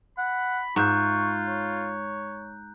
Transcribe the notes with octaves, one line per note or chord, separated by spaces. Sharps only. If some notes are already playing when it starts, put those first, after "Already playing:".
F#5 B5
G#2 F4 E5 A#5 C#6 F#6 G6
C#5